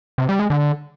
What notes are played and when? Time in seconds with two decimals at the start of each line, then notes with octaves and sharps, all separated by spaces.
0.18 C3
0.29 G3
0.39 G#3
0.50 D3